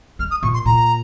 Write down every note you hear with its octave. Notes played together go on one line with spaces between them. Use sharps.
G#3 F6
D#6
A#2 C#6
C6
A#2 A#5